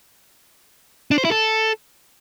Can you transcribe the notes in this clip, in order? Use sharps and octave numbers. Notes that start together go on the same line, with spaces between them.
D4
C5
E4
A4